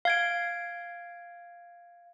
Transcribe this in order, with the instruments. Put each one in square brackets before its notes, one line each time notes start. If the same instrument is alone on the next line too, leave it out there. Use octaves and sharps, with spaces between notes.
[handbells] F5 G#6 D7